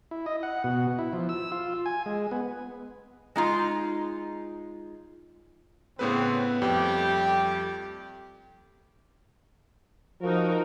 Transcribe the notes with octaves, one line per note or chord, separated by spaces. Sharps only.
E4
D#5
F#5
B2
E4
F3
E6
F4
G#5
G#3
B3
G#3 D#4 F4
A2 C#3 B3 C4 B4
F2 G3 A3 G4
F3 D#4 F#4 A#4